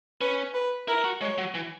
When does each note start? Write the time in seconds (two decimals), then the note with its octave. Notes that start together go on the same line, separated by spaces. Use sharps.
0.21 C#4 B4
0.54 B4
0.88 E4 A#4
1.04 F#4
1.21 G#3 C#5
1.38 F#3
1.54 E3